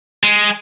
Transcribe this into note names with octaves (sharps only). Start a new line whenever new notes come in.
G#3